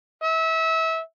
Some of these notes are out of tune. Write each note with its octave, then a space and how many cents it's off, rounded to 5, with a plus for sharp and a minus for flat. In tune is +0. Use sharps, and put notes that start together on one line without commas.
E5 -25